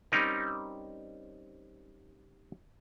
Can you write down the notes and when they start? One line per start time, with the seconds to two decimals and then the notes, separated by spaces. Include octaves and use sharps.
0.12 G3 C4 C#4 D#4 A#4